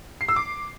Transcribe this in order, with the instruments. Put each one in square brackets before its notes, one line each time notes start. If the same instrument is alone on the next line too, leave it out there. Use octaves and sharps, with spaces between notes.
[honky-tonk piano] C7
E6
D6